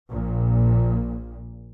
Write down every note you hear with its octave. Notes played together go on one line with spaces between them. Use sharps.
A#1 A#2